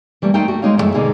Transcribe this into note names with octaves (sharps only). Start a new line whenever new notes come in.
E3 G3 A3 A#3
A3 A#3 D#4 A#4 C5 G5
A3 F#4
G#3 A#3 D#4 C#5 F5
F#2 A2 E3 G#3 A3 E5
B2 D3 A#3 D#4 G#4